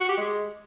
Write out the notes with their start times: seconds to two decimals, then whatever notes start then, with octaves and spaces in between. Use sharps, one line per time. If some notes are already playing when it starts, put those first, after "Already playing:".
0.01 F#4
0.09 G4
0.17 G#3